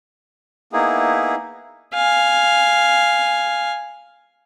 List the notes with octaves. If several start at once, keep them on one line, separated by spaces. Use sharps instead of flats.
A#3 B3 D#4 E4 G#4
F5 G#5